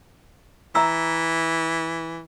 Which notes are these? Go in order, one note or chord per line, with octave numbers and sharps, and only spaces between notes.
E3 E5 A#5 E6